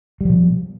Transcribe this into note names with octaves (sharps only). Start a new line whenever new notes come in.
B2 F3 G3